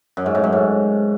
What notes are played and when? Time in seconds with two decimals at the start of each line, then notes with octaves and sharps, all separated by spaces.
0.17 F#2
0.26 G#2
0.35 A2
0.44 F#2
0.52 G#2